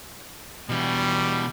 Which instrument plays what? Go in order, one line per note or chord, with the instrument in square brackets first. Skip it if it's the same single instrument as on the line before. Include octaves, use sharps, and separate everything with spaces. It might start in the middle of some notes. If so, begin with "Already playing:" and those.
[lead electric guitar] B2 E3 [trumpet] G3